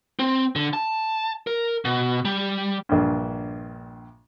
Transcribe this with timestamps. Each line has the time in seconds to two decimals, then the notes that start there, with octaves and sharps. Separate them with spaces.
0.19 C4
0.56 D3
0.73 A5
1.47 A#4
1.85 B2
2.25 G3
2.89 A#1 G2